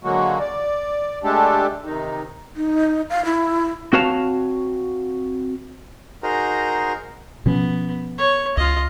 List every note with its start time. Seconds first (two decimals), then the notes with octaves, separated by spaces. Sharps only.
0.04 D3 F#3 G#3 A#3 F#4
0.39 D5
1.24 G#3 A3 D4 G4 A4
1.85 C3 D#3 D#4
2.56 D#4
3.10 F5
3.25 E4
3.93 C4 F#4 B4 C#5 F5 A5
6.23 D#4 F#4 G#4 A#4 C5 A#5
7.46 B2 F3 B3 C#4
8.18 C#5
8.57 C#2 F4 D#5